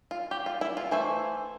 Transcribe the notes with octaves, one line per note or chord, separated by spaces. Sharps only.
F4
G4
F4
E4
F4
E3 A3 E4 C5